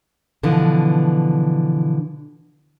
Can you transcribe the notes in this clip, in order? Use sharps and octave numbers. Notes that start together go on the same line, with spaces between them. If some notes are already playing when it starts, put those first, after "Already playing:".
B2 D3 E3 F3